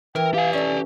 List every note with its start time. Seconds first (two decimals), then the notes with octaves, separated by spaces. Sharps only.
0.16 E3 A#4 G5
0.34 G4 F5 G#5
0.53 C#4 A4 D5